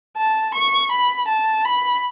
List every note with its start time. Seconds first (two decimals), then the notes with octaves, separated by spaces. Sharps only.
0.17 A5
0.54 C#6
0.91 B5
1.28 A5
1.65 B5